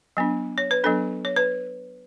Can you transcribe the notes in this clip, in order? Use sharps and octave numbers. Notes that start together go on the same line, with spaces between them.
F#3 B3 D4
C#5
B4
F#3 B3 D4 A4
C#5
B4